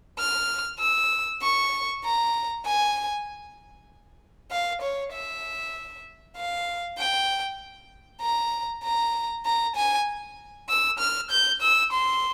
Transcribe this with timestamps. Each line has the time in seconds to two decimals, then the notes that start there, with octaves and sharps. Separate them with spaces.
0.19 F6
0.80 E6
1.42 C#6
2.05 A#5
2.65 G#5
4.51 F5
4.82 C#5
5.13 E5
6.37 F5
6.98 G5
8.21 A#5
8.84 A#5
9.45 A#5
9.76 G#5
10.69 E6
10.99 F6
11.31 G6
11.62 E6
11.92 C6